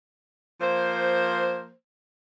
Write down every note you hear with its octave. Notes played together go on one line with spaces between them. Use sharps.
F3 A#3 C5